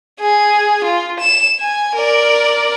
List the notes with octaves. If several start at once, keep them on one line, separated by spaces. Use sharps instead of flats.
G#4
F4
E7
G#5
A#4 D5